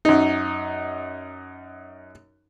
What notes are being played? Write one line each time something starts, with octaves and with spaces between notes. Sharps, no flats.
F#2 D#4